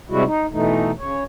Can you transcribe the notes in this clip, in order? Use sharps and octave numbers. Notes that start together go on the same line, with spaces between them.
C3 G3 G#3 E4 F#4
D#4
B2 E3 A3 D#4
C#3 C#5